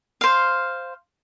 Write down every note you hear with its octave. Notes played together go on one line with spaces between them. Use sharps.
C5 F5